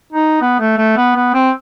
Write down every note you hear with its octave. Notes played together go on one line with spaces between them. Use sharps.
D#4
B3
A3
A3
B3
B3
C4